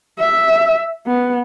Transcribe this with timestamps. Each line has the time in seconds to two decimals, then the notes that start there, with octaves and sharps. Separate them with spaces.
0.19 E5
1.06 B3